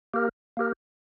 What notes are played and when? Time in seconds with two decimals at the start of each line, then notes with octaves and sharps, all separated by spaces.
0.14 A#3 G4 A#4
0.57 A#3 G4 A#4